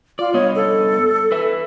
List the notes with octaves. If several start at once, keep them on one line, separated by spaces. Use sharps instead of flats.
F4 D5
G2 B3 C#5 D#5
A4
B4 E5